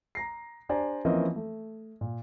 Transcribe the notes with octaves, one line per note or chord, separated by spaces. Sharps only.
A#5 A#6 C7
D4 G4 C5 D5 G#5 A#5
E3 F3 A#3 C4 C#4 D#5
A3
A#2